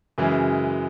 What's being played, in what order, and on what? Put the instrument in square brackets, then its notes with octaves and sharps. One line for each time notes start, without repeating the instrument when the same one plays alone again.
[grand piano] F#2 C#3 E3 G#3